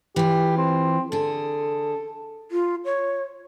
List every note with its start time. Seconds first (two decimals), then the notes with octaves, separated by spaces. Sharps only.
0.16 E3 F4 G4
0.58 C4
1.12 D3 G#4 A4
2.51 F4
2.85 C#5